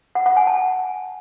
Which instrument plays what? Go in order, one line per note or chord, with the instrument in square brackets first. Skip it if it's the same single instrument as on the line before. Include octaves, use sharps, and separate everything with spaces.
[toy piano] F#5
F#5
G#5
A5